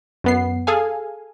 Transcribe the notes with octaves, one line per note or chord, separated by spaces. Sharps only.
F#2 B3 C7
G#4 A4 F5 G#5